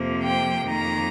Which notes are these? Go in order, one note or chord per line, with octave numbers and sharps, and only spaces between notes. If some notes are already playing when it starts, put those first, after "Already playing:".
Already playing: F2 C3 F3 A#3
G5
F2 D#3 A#3 A#5